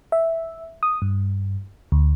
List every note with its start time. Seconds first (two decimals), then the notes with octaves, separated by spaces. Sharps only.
0.12 E5
0.83 D#6
1.02 G2
1.92 D2